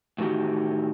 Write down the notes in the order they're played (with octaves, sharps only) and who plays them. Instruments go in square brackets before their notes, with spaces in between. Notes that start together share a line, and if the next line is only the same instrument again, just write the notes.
[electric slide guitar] A2 D#3 E3 F#4 G4